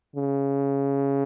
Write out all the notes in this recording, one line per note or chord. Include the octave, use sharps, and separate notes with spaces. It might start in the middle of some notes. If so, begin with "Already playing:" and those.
C#3